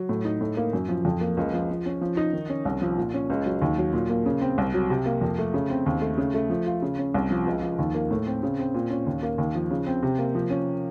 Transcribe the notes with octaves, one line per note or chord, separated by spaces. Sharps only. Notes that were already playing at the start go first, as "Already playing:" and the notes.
Already playing: F#3
A2
D#4
A2
A#3
F#2
F3
F2
A#3
C#2
F3
F3
C#4
F3
D#4
D#3
C#4
C2
F3
A#2
C#4
C#2
F#3
D#2
F#3
A#2
A#3
C#3
C4
C2
F#3
C3
A#3
F2
A3
C#3
C4
D#2
A3
C#3
A3
F3
F4
C#3
C#4
C2
F3
C#2
F3
D#2
A#3
A2
C4
C#3
C4
A#2
C#4
D#2
A#3
D#2
F3
C#3
C4
C3
A#3
F3
C#4